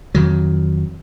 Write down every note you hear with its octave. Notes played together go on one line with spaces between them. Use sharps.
F2 D#3 F#3